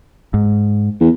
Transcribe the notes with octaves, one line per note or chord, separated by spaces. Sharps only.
G#2
E2